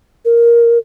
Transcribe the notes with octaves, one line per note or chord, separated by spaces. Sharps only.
A#4